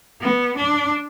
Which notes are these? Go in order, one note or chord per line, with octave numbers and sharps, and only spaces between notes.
B3
D4